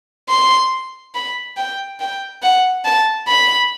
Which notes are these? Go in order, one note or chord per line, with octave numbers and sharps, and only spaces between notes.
C6
B5
G5
G5
F#5
A5
B5